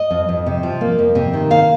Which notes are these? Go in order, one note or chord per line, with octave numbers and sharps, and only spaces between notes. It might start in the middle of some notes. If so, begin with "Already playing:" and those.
Already playing: D#5
F2
F2
C3
F3
A#3
F2
C3
D#3
A#3 F5